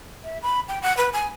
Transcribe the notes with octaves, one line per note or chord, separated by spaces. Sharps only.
E5
B5
G5
F#5
B4
G#5